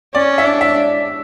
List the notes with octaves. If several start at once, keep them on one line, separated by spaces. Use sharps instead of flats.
C#4 D5
E5
D4
E5